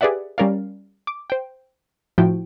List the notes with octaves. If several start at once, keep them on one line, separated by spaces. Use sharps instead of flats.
G4 G#4 B4 D5 E5 F#5
G3 C#4 A#4 D5 F5
D6
C5 G5
A2 F3 E4 F#4 G5